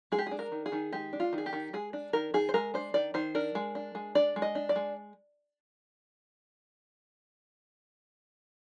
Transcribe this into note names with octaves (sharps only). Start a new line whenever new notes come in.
G#3 G#4
G4
D4 G#4
A#4
D#3
G#4
D#3
G#3 G4
D4
F4
D#3
G#4
G4
D#3
G#3 G#4
D4
D#3 A#4
D#3 G#4
C5
G#3 A#4
D4 C5
D#3 D5
D#3 C5
D4 A#4
G#3
D4
G#3
D4 D5
G#3
D#5
D4
D5
G#3